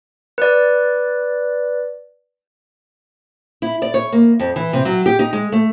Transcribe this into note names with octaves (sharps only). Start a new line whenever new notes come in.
B4 D5
E4
D5
C#5
A#3
F2
E3
C3
F#3
G4
D#4
G#3
A3